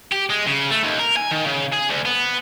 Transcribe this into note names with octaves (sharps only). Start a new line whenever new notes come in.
G4
G#3
C#3
A3
D#2
A#4
G#5
D#3
C#3
G#4
D2
B3